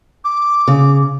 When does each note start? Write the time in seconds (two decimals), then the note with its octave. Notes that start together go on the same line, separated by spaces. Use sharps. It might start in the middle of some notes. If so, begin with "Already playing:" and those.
0.24 D6
0.68 C#3